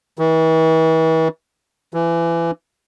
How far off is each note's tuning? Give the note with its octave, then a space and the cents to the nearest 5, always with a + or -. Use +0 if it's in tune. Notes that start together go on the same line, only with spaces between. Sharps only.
E3 -40
E3 +25